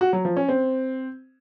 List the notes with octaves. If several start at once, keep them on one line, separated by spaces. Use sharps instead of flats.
F#4
F#3
F3
C#4
C4